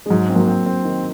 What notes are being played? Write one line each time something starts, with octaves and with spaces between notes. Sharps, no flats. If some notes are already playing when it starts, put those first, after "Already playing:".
G#3
G#2 F#3
C4
F#3 A#3
C4
C4
D#3